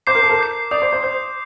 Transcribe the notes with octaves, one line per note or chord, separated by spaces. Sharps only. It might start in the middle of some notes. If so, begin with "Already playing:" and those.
C5 D6 G6 C7
A#4
A4
A#4
D6 G6 C7
D5 D#6 G6 C7
C5
C5
C5 D#6 G6 C7